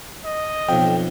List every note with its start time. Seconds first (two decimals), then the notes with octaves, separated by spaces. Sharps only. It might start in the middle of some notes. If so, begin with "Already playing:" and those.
0.25 D#5
0.69 B1 F2 G5